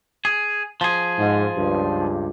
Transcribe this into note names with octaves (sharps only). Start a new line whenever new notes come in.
G#4
F3 G#4
G#2
C#2 G2